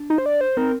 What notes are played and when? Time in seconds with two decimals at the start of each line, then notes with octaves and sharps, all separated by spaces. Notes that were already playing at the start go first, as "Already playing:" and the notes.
Already playing: D4
0.10 D#4
0.18 C5
0.26 D5
0.41 C5
0.57 C4 D#4 A#4